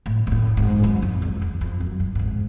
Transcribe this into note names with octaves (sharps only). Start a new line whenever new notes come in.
A2
G#2
A2
G#2
F#2
F2
E2
E2
F2
F#2
G2
A2
G#2